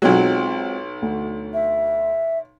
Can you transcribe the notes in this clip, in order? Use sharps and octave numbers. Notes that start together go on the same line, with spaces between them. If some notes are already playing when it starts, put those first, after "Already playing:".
B1 F#3 G#3 C4 F4
D2
E5